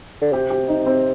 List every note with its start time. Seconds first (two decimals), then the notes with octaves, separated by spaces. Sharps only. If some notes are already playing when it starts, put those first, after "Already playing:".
0.21 D3
0.32 C3 G4
0.50 G4
0.68 D#4
0.86 C4